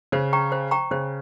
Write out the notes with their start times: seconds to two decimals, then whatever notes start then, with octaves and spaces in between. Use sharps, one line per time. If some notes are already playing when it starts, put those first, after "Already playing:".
0.12 C#3 C5
0.33 G5 A#5 C#6
0.52 C5
0.71 G5 A#5 C#6
0.91 C#3 C5